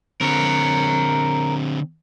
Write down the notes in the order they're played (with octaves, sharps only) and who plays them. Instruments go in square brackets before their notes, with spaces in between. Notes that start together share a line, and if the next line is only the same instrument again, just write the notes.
[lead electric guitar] D3 C4 [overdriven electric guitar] A#4 C#5